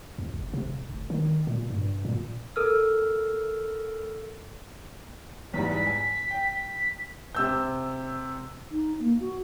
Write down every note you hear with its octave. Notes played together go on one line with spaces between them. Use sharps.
E2
G1
C3
D#1
F1
D#3
A#2
G2
A#2
A4 A#4 E6 F6
E2 G#2 G3 B6
G#5
G5
C3 E6 G6
D#4
A#3
F#4